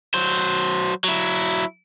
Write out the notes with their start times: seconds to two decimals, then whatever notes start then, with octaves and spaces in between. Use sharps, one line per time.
0.14 F#3 C5
1.04 F#3 E4